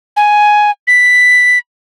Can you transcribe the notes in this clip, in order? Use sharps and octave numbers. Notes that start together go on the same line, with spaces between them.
G#5
B6